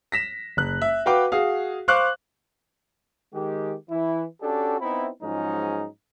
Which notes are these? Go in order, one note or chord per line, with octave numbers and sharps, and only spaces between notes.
A#6 B6 E7
F#1 F#6
E5
F#4 B4 F5 G5 D6
F#4 G#4 F5
C5 F5 C#6 D6 F#6
D#3 G#3 G4
E3 E4
C#4 D4 F#4 G4 A4
B3 C4 D#4 E4
G#2 F3 F#3 G#3 C#4 D#4